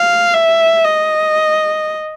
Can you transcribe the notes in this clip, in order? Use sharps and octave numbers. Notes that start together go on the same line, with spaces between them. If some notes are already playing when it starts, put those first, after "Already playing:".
Already playing: F5
E5
D#5